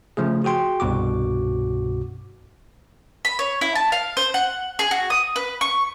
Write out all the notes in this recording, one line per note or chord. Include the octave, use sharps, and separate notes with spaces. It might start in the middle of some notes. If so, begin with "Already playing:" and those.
C#3 F3 A3 G#4
F#4 G#4 G5 C6
C2 G2 B2 F#4 D6
B5
C#5
E4
A5
F5
C5
F#5
G#4
F#4
D#6
B4
C#6